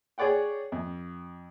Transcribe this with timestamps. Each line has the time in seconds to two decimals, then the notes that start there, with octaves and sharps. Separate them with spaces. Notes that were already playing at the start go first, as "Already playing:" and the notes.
0.18 G#4 C#5 D5 F#5 G5
0.72 F2